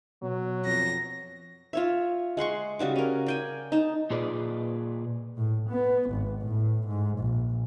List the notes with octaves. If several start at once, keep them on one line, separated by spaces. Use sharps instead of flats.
B2 F#3
F2 A#6
F4 C#5 E5
G#3 F#5 C6 C#6
C#3 G3 F#4 D6
C#4 A#4
D5 G5 G#5
D#4 A5
A#2 F4 G#4 B4 D5 D#5
A2
B3
G#1
A2
G#2
A#1